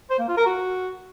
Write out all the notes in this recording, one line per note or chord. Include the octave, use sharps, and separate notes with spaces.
C5
A#3
F4
A#4
F#4